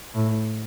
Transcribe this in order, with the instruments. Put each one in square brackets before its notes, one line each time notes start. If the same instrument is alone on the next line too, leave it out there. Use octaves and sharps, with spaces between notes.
[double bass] A2